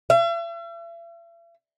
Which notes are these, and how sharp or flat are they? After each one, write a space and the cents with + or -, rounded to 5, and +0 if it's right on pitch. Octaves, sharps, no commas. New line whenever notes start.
E5 +45